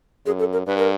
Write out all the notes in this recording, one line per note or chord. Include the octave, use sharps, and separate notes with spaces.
F#2 G#4
A4
A#4
G2 B4
A#4